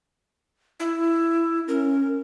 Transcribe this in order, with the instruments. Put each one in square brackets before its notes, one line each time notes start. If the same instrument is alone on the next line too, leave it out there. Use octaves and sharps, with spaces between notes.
[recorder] E4
[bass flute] C#4 [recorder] A#4